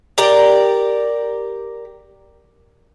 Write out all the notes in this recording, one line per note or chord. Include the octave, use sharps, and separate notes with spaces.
G4 A#4 D5